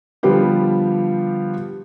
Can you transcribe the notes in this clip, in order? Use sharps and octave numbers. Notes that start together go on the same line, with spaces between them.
D3 F3 G3 B3 F4 G4